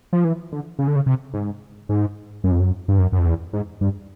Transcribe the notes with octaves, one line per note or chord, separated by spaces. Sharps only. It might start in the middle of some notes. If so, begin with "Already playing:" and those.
F3
E3
D3
C#3
D3
C#3
C3
G#2
G#2
F#2
F2
F#2
G2
F#2
F#2
F2
E2
G#2
G2